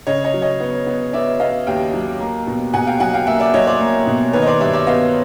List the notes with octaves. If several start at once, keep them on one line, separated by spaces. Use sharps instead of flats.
C#3 C#5 D#5
C#5 D#5
F#3
C#5 D#5
B3
B3
B3 D5 E5
B3 D#5 F5
D#2 F5 G5
F#3
A#3
B2
B2 F#5 G#5
F5 G5
F#3 F#5 G#5
F5 G5
A#3 E5 F#5
D5 E5
F#3 C#5 D#5
C5 D5
A#3
B2
D#3 B4 C#5
D#5
C5 D5
G2 D5 E5
D5 E5
B3 D#5 F5